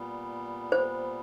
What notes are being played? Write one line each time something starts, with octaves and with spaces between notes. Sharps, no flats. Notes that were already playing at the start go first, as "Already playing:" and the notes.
Already playing: A#2 G3 B3
C5